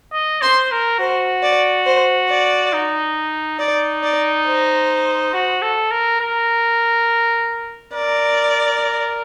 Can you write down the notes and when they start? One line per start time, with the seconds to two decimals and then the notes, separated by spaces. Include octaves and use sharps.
0.13 D#5
0.42 C5 C6
0.72 A#4
0.99 F#4 C5
1.43 D5
1.86 C5
2.29 D5
2.73 D#4
3.59 D#4 D5
4.03 D5
4.47 C5
5.33 F#4
5.62 A4
5.91 A#4
6.20 A#4
7.94 A#4 D5